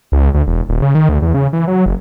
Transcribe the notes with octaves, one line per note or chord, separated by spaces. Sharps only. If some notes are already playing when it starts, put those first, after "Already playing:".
C#2
D2
E1
D#1
C#3
D#3
D2
E2
C#3
E3
F#3
F#1